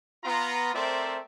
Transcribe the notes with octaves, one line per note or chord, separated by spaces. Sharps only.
B3 F4 A#5
A3 C4 A#4 C5 D5 E5